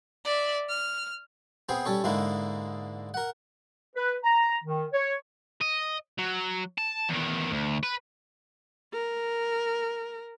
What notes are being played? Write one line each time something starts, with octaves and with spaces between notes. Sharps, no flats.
D5 E5
F6
B3 C4 G#4 C5
G3 C#4 A4 C#5
G#2 D3 G#3 A#3 D#4 E4
A#4 F#5
B4
A#5
D#3
C#5
D#5
F#3
A5
E2 D#3
D2
B4
A#4